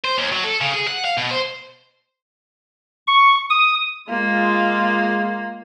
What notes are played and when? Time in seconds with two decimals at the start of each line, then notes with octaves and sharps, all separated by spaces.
0.05 C5
0.18 D#2
0.32 F#3
0.44 A4
0.61 C#3
0.74 G#4
0.88 F#5
1.04 F5
1.18 B2
1.31 C5
3.07 C#6
3.50 D#6
4.09 G#3 A#3 F4